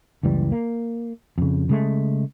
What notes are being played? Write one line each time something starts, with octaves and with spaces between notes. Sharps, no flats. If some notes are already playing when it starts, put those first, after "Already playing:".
F#1 C#2 E3 G3
A#3
F2 C#3
C#3 G#3 A3